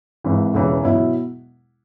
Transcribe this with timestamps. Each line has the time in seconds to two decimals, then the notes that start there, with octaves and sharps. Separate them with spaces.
0.24 G#1 G#2 E3
0.54 E1 E2 C#3 E3
0.83 B2 F#3 E4